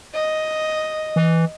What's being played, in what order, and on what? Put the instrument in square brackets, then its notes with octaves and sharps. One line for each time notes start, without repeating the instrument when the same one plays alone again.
[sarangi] D#5
[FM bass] E3